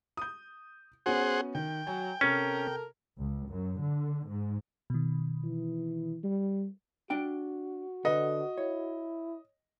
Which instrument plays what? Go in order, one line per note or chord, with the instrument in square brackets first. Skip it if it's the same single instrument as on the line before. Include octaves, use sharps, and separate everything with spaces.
[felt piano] D#6 G6
[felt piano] B3 C#4 F#4 [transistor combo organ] G#4 C5 F#5
[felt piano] D#3 [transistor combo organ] G5
[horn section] F#3 [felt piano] G#5
[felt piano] C3 [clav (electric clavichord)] C#4 [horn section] A4 A#4
[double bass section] C#2
F#2
D3
G#2
[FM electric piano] B2 D#3
[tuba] E3
G3
[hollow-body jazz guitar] D4 G5 [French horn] F#4
[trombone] D3 [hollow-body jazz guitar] A4 B4 [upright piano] D#5
[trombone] E4 [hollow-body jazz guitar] C#5